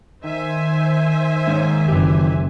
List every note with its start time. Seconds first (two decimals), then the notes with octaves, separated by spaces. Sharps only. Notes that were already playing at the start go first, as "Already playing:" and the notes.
0.24 D#3 C5 E5 G#5
1.47 G#2 A#3 C#5
1.88 F#1 E3 G4